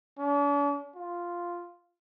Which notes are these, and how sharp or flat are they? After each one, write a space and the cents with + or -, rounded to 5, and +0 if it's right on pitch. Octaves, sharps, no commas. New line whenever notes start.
D4 -45
F4 +0